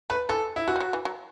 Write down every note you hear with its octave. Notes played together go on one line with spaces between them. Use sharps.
A3 B4
E3 A4
E4
E3 F#4
G3
F#3
E3
F#3